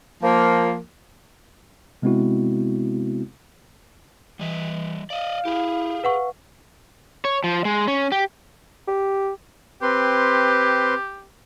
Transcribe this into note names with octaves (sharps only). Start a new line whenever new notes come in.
F3 A#3
C3 G#3 B3 C4 E4 F#4
E3 G3 D#5 E5
D5 D#5 F5
E4 G4 G#4
B4 F#5 C#6
C#5
F3
G#3
C#4
G4
G4
C4 G4 B4 C6